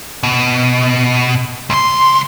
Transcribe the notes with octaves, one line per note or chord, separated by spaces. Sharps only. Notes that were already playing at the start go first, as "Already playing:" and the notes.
B2
C#2 C6